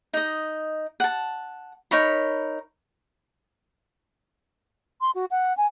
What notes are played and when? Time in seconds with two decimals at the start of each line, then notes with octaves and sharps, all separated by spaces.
0.13 D#4 D#5
1.00 F#5 A5
1.91 D#4 A#4 C#5 B5
5.01 C6
5.15 F#4
5.31 F#5
5.57 G#5